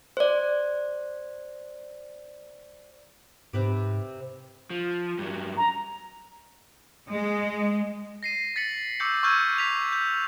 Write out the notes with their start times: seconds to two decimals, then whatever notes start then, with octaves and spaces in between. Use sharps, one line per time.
0.17 C5 D5
3.53 G#2 C3 B4 D6
4.70 F3
5.19 G2 F#3
5.57 A#5
7.09 G#3
8.23 A#6 C7 D#7
8.56 A6 B6 C#7 F#7
9.00 C#6 D6 E6 G6 C#7 F#7
9.23 C#6 E6 F6 G6 G#6 D#7
9.58 G6 B6 F7
9.93 G6